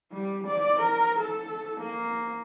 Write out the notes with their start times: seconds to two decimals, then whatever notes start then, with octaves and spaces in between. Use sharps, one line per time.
0.12 G3
0.47 D5
0.79 A#4
1.19 A4
1.80 A#3